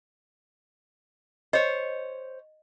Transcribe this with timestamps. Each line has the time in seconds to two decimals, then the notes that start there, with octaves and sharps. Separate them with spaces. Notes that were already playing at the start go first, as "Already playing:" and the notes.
1.53 C5 C#5 D#5